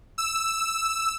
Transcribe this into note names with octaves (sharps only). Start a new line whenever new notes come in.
E6